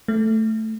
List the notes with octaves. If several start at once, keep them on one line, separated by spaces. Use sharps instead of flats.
A3